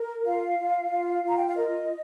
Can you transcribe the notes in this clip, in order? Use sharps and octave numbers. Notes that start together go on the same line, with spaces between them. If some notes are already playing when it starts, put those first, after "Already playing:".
Already playing: A#4
F4 F5
F4
F4
F4 A#5
G5
F5
A#4 D#5